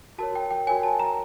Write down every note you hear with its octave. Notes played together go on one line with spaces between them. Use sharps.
F#4 A#4 C#5 A5
G5
G5
F#4 A#4 C#5 G#5
A5
A#5